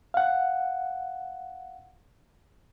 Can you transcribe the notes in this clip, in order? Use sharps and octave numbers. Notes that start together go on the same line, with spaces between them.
F5 F#5